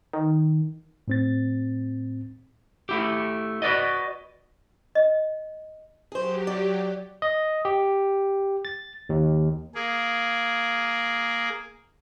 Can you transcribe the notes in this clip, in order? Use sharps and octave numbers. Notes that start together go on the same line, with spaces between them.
D#3
A2 C4 A6
A3 E4 G4
F#4 B4 D5 D#5
D#5
F#3 G4 G#4 C5
D5
D#5
G4
A6
D#2
A#3 G#4